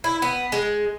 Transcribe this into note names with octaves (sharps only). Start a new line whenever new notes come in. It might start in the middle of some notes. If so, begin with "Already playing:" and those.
E4
B3
G#3